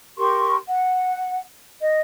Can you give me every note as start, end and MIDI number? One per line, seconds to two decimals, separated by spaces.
0.18 0.57 67
0.18 0.57 70
0.18 0.57 84
0.18 0.57 85
0.68 1.42 78
1.82 2.01 75